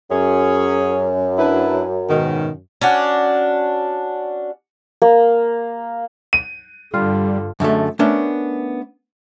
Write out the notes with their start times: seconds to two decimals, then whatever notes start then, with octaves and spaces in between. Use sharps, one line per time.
0.11 F#2 C#4 G#4 C#5
1.38 D4 E4 B4
2.09 G#2 B2 D#3
2.81 C#4 D4 F#4
5.02 A#3
6.33 D#7
6.94 G2 D3 G3 F4
7.60 F#2 D3 G#3 A3
7.99 A3 B3 C#4 D4 A#4